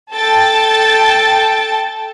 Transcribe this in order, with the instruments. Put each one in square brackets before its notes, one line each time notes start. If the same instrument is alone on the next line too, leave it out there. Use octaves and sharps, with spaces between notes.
[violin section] A4 G5 A5 A6